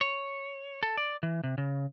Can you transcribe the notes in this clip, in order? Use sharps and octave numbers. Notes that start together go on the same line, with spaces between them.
C#5
A4
D5
E3
C3
C#3